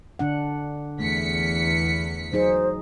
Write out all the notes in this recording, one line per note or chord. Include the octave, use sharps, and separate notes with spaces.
D3 D4 F#5
E2 A3 B6 C#7
F#3 D#4 G#4 C5